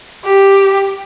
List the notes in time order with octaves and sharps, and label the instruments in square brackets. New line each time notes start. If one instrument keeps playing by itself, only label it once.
[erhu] G4